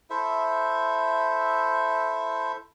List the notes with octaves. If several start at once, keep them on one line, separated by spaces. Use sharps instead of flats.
E4 A4 C5 E5